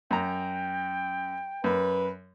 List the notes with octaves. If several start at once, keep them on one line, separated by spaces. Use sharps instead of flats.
F#2 G5 A#5
F#2 B4